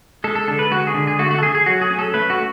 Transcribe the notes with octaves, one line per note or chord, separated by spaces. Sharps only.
G#3 A4
A4
D3 A4
B4
G#3 F#4
G#4
D3
G#4
A3 F#4
F#4
A4
A3 G#4
G#4
F#3 F#4
G#4
C#4
A4
A3 B4
F#4